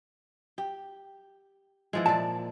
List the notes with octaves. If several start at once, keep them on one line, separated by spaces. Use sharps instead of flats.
G4
E3 F3 G#3
A#2 D5 A5